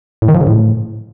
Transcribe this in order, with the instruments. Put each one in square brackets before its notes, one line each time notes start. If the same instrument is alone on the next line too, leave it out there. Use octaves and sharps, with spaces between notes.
[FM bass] A2
D#3
F3
C#3
A2